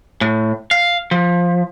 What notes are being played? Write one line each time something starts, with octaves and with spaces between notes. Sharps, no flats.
A2
F5
F3